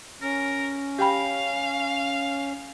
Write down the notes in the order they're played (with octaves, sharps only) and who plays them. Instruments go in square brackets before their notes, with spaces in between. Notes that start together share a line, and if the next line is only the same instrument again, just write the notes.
[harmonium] C#4 [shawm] A#4
[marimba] G4 G5 B5 [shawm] F5